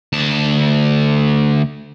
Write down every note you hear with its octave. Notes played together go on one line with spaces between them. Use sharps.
D2 A5